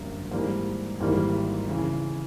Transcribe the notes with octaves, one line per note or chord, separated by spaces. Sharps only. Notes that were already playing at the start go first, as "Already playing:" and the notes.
Already playing: G#1 F#2 D3 G3 A#3
G#2 E3 G3 A#3
G#1 G#2 E3 G3 A#3
C#3 E3